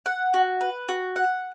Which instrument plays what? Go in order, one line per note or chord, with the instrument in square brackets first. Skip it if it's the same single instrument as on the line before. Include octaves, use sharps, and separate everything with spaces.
[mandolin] F#5
F#4
B4
F#4
F#5